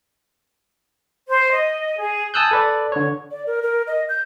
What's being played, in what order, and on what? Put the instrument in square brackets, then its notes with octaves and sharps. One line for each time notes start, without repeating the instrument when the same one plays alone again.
[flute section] C5
D#5
G#4
[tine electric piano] G#5 A5 D#6 E6 F#6 G6
A4 B4 D5
D3 C#5
[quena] D5
A#4
A#4
D#5
G6